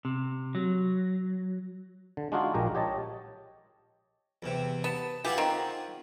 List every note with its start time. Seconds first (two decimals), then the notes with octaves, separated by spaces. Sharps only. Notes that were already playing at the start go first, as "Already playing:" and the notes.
0.05 C3
0.55 F#3
2.17 D3
2.32 G#3 D4 D#4 F4 F#4 G#4
2.54 A#1 A#2 G#3 G4 A#5
2.75 G4 C#5 D#5 A5
4.42 E2 C3
4.84 B3 A5
5.25 E3 F4 G4 G#4 F#5
5.38 D#3 C4